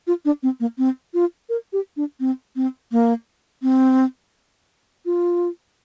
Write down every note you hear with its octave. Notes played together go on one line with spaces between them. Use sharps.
F4
D4
C4
A#3
C4
F4
A#4
G4
D4
C4
C4
A#3
C4
F4